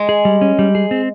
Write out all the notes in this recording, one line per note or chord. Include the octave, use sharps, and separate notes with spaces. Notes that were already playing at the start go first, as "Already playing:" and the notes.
Already playing: G#3
G#4
G3
C#4
G3
G#4
C4